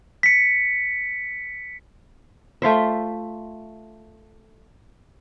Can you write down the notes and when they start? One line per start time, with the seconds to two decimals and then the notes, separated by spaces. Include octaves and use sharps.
0.23 B6 C#7
2.62 A3 F4 C5 E5